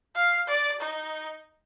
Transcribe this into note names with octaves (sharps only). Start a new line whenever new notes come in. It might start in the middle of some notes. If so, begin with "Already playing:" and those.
F5
D5
D#4